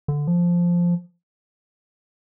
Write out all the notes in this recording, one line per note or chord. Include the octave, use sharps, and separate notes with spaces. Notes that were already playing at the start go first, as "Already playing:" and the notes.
D3
F3